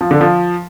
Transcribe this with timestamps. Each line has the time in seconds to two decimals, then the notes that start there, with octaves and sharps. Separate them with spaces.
0.01 F3
0.11 D3
0.21 F3